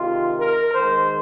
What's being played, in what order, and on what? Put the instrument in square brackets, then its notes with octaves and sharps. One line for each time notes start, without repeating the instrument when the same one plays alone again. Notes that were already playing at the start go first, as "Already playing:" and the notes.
Already playing: [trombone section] C3 D#3 G#3 F4
A#4
D#3 G#3 C5